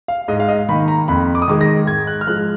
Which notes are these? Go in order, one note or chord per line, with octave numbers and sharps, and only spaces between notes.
F5
G#2 D#5
F5
D#5
D#3 A#3 B5
A#5
F2 B5
D6
D#6
D#3 G#3 D6
A#6
G#2 G#6
F#6
F6
F3 G#3 F#6